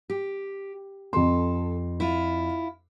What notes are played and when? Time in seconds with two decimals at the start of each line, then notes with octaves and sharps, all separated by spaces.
0.10 G4
1.13 F2 A4 C6
2.00 E4 F4